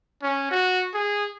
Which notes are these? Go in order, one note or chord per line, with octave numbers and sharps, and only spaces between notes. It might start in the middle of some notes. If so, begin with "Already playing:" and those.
C#4
F#4
G#4